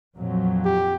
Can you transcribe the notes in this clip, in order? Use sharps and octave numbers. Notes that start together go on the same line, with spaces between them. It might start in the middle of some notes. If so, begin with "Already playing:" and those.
F2 A#2 F#3
G4